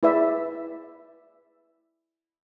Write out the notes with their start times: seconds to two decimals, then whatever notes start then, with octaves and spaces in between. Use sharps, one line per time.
0.03 E4 G#4 B4 D5 E5